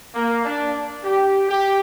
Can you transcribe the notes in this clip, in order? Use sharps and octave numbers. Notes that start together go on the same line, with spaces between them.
A#3
D4
G4
G4